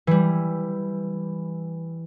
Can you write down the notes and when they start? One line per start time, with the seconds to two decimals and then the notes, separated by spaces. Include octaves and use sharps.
0.07 E3 G3